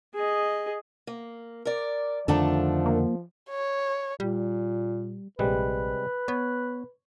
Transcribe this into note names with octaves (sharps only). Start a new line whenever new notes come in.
G#4 D#5
A#3
A#4 D5
F2 D3 D#3 F3 A3 D4 A4
A#3
C#5
A#2 G3
A#1 C3 G3 G#3 B4
B3 C#5